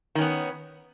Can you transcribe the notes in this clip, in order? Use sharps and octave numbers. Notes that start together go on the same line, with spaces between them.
D#3 B3 C#4